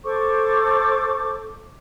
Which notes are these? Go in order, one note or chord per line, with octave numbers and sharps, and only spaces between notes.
A4 C5 C#6 D6